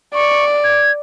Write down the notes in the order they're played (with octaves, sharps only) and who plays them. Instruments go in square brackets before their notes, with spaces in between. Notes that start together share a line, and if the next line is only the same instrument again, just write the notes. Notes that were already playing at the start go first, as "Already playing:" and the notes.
[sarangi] D5 [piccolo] C#6
[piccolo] G#6